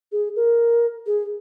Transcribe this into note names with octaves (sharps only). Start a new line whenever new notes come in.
G#4
A#4
G#4